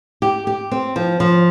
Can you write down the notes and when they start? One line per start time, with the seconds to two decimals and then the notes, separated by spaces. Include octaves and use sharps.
0.22 G4
0.47 G4
0.71 C4
0.96 F3
1.20 F3